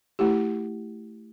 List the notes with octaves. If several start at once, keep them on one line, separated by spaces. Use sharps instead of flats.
A3 E4 G4